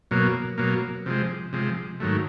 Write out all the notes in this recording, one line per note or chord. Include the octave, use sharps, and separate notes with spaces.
B2 F#3 A#3
B2 F#3 A#3
C3 F3 G#3
C3 F3 G#3
G#2 D#3 F#3 A3